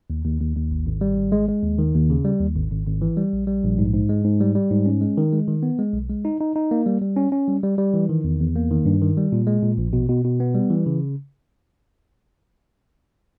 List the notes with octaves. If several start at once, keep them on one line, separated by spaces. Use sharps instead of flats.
D#2
D#2
D#2
D#2
G#1
G#1
G3
G#1
G#3
G#3
D#2
D#3
D#2
C#3
G3
D#2
G#1
G#1
G#1
E3
G3
A#1
G3
A#1
G#2
G#2
G#3
G#2
G3
G3
G#2
C#4
G#3
D#3
G#3
D#3
B3
G#3
B1
G#3
D#4
D#4
D#4
A#3
G3
G3
C#4
C#4
G3
G3
G3
E3
D#3
E2
E2
A#3
D#3
G2
D#3
G3
A#2
G#3
A#2
A#1
B2
B2
B2
B3
G3
E3
C#3